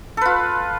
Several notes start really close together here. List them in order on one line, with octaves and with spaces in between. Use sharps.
A4 B4 F4